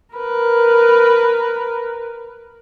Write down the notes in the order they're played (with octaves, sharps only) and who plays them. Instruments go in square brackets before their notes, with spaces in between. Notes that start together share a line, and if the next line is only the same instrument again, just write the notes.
[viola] A#4 B4